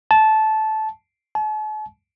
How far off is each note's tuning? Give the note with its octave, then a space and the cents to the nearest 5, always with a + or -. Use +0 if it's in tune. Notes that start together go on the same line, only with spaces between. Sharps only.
A5 -15
A5 -45